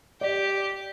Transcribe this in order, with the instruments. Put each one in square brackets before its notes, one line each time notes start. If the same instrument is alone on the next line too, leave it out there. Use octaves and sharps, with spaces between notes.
[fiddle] G4 [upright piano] D5